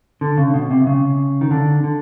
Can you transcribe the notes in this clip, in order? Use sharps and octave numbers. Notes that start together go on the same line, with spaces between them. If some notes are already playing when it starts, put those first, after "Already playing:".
D3
C#3
B2
C3
C#3
D#3
D3
D3